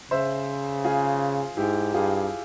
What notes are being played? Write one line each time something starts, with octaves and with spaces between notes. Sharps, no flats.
C#3 C5 E5
F4 G#4
G#2 E4 G4
G2 F4 G#4